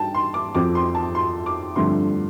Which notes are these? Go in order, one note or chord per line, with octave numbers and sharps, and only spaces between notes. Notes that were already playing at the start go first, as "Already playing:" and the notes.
Already playing: G2 G5 A5
C6
D6
F2 F3 C4 D6
C6
A5
C6
D6
G2 D3 F3 A3 C4 C6